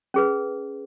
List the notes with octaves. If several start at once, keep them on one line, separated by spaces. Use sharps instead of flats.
C#4 G#4 B4